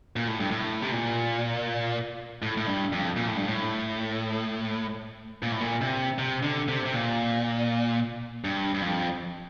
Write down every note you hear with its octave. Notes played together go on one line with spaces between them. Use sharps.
A#2
A2
G2
A2
C3
A#2
A2
A2
G2
F2
A#2
A2
G2
A2
A#2
A2
A#2
C3
C3
D3
C3
C3
A#2
G2
G2
F2